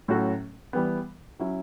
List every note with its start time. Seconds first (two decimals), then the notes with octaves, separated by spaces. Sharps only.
0.08 A2 F#3 C#4 F#4 A4
0.73 E3 G3 B3
1.39 F#3 C#4 E4